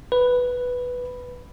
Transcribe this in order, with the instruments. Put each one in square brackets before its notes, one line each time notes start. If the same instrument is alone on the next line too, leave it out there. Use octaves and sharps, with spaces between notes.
[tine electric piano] B4